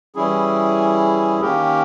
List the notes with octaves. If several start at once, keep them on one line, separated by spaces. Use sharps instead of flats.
E3 G3 C#4 E4 G#4
D#3 A#3 C#4 G4 A#4